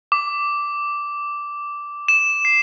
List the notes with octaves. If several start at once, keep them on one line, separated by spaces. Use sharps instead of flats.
D6
E7
C7